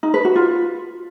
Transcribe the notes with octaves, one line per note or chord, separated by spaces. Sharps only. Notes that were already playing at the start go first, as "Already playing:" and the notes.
D#4
B4
F#4
F4